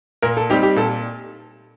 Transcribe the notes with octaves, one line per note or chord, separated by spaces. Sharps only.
A#2 A#4
A4
G3 C4 D#4 G4
G4
A#2 A4